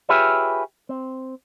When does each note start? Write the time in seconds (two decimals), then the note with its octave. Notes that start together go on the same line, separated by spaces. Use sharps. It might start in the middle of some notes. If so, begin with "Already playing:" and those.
0.09 F4 G4 G#4 B4 C#5 E5
0.89 C4